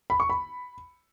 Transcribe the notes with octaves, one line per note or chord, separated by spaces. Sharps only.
B5
C#6
B5